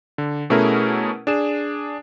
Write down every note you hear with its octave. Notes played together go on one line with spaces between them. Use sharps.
D3
B2 A3 C#4 E4 G#4 A#4
D4 G#4 E7